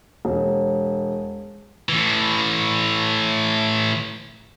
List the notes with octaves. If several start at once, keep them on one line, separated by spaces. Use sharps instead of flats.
E1
A2 E3